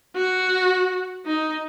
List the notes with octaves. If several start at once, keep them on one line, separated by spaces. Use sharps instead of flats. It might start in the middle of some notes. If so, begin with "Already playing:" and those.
F#4
D#4